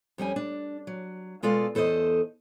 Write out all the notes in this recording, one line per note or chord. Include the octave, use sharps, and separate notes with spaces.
F2 G3 C#4 G#5
D4
F#3
B2 G#3 F4 A4 D5 F5
E2 A4 C5 C#5 D#5